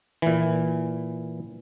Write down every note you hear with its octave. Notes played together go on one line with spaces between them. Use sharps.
A#2 E3